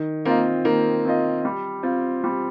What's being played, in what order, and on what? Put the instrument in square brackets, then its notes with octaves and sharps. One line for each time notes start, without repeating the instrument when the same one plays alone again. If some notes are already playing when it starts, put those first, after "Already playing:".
Already playing: [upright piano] D#3
[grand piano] A#3 [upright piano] C4 F4 D#5
[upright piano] D#3 [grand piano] A#3
[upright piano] C4 F4 D#5
G3
C4 F4
G3